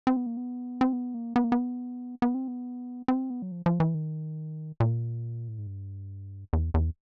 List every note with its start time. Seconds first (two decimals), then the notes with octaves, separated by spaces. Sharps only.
0.07 C4
0.17 B3
0.26 A#3
0.37 B3
0.81 C4
0.93 B3
1.14 A#3
1.36 B3
1.44 A#3
1.52 B3
2.22 B3
2.35 C4
2.48 B3
3.08 C4
3.30 B3
3.42 F#3
3.52 F3
3.66 F3
3.80 E3
3.94 D#3
4.80 A#2
5.48 A2
5.58 G#2
5.67 G2
6.53 E2
6.74 E2